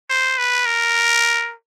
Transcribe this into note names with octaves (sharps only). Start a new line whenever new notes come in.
C5
B4
A#4